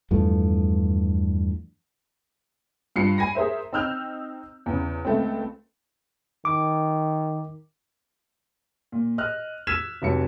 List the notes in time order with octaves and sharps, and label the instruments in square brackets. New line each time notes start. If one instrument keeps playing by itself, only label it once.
[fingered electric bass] E2 G2 F3 A3
[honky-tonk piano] G2 F4 C7 C#7
G#5 B5 A#6
G#4 A#4 C5 E5
C4 D#4 E6 F6 G6 F7
E2 C#3
C#2 A3 C4
[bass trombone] D#3 [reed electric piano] D6
[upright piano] A#2
D#5 F6 F#6
E6 F6 G#6 B6 E7
F1 F2 F#3 C#7